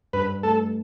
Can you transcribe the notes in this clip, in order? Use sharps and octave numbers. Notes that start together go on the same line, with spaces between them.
G2 B4
A3 A4